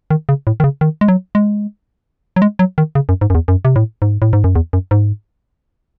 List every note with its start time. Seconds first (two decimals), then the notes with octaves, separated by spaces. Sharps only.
0.11 D#3
0.29 C#3
0.47 A2
0.60 D#3
0.64 C#3
0.81 D#3
1.01 G#3
1.08 F#3
1.35 G#3
2.36 F#3
2.42 G#3
2.59 F#3
2.78 D#3
2.95 C#3
3.09 F#2
3.21 G#2
3.30 F#2
3.35 E2
3.48 F#2
3.65 C3
3.76 A2
4.02 G#2
4.22 A2
4.33 G#2
4.44 F#2
4.55 E2
4.73 F#2
4.91 G#2